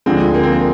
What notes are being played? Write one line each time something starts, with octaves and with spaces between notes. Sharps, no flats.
D2 D3 F3 G#3 C4
A#3
C4
A#3